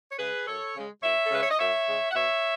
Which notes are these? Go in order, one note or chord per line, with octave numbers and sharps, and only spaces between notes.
C#5
C#3 G#3 G#4 B4
F#2 A4 C#5
C#3 G#3
F#2 C#5 E5
A4
C#3 G#3 B4
C#5
D#5
F#2 C#5 E5
C#3 G#3
F#5
B2 C#5 E5